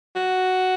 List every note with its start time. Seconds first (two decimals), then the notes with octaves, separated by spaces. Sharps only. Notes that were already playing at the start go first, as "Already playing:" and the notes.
0.16 F#4